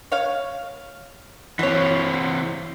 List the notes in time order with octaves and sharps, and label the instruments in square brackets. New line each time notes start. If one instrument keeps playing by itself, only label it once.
[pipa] C#5 F5
[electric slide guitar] E3 C4 [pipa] F#3 C#5